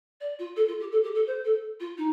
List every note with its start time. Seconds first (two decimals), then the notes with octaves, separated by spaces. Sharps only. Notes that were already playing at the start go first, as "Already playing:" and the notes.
0.20 D5
0.38 F4
0.56 A4
0.67 F4
0.79 G4
0.91 A4
1.03 G4
1.14 A4
1.26 C5
1.44 A4
1.79 F4
1.97 D#4